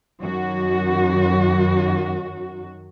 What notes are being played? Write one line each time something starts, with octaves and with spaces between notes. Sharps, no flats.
F#2 D#3 F#4